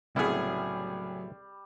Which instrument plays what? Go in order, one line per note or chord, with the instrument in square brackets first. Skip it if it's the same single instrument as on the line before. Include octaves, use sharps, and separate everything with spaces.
[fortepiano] C2 G#4 [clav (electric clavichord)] A2 B3 E4 [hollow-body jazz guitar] C#3 F#3 [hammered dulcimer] G3